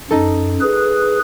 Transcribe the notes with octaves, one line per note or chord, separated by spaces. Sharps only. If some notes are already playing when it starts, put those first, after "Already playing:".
F#2 D#4 A4
G#4 B4